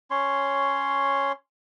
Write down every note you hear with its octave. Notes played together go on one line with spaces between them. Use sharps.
C#4 C#5 C6